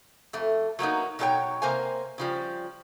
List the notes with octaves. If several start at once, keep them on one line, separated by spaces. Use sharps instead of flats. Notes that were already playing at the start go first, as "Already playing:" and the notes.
F2 A3
F#3 A#3 B3 D#4
B2 F#3 D#4 A4 C#5 G5
C3 A#3 C5 F5 G#5
C#3 F3 G3